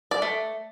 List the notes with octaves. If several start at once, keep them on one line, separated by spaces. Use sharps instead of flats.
D5
A3